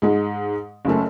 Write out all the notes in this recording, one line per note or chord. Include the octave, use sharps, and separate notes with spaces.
G#2 G#3
F#1 F#2 A3